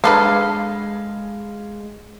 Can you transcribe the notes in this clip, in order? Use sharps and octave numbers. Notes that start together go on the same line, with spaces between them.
D3 G#3 A4 B4 F5